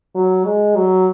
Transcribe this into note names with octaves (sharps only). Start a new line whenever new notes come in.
F#3
G#3
F#3